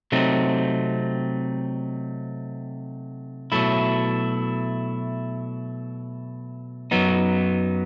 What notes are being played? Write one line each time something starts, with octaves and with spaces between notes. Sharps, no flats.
C3 F#3 A3 C4 D#4
B2 F#3 A3 E4
F#2 F#3 B3 D#4